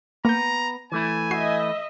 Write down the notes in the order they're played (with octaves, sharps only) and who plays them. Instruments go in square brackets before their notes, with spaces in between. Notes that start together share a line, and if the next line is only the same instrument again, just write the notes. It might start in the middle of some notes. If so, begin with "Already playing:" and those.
[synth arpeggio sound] A#3 G6 [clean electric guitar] B3 [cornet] A#5
[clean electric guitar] E3 A3 E4 [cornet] G#5
[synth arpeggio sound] F#4 C7 [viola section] D#5 E5